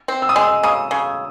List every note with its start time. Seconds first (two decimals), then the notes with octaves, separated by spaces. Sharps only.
0.08 C4
0.22 E6
0.29 D#6
0.36 G#3 E6
0.63 C#3 D#6
0.91 C#3